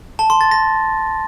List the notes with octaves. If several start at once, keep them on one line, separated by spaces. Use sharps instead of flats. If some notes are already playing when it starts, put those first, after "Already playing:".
A5
C6
A6
A#6